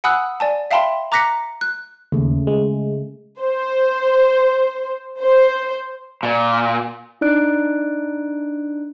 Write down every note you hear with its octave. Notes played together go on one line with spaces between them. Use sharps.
F#5 G#5 B5 D#6 E6 F#6
D5 G#5 A5
E5 F5 G5 A5 B5 C6
A#5 D6 F#6 A#6 B6 C#7
F#6
D#2 C#3 A3
G#3
C5
C5
A#2
D4 D#4 D5 F#6 D7